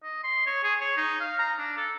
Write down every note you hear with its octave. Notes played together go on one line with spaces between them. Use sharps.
D#5
C6
C#5
G#4
C#5
D#4
F5
A#5
D4
A4